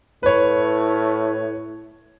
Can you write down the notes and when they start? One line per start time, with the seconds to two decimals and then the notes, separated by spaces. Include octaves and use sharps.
0.23 A2 B4 C#5